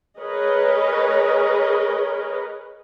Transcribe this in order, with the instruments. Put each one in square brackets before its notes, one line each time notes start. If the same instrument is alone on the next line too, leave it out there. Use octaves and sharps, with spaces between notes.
[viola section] G#4 A#4 B4 C#5 D#5